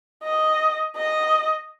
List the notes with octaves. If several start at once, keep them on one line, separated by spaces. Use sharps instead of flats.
D#5
D#5